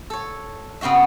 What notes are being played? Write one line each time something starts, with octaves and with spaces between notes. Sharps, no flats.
A4 C#5
C#3 B3 C4 F#4 E5